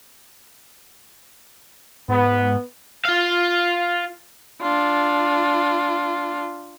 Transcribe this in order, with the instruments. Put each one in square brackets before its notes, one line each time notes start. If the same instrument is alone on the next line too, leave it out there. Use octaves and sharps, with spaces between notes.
[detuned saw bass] G#2 [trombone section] B3
[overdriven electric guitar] F4 F5
[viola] D4 F4